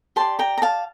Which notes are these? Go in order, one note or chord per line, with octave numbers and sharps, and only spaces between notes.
G4 D5 A5 C6
G5 A#5
A#5
F5 A5